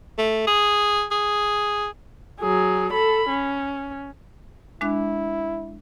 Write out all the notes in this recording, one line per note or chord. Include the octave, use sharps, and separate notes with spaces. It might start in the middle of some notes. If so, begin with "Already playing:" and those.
A3
G#4
G#4
F#3 G#4
A4 B5
C#4
G#3 D4 E4 F#6